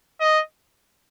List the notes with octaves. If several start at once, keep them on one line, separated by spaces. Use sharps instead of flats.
D#5